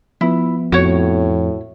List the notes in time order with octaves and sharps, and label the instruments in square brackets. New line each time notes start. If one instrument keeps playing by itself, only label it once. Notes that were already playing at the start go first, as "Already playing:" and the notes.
[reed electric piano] F3 B3 [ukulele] E4
[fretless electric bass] F2 [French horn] A2 [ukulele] F#4 C#5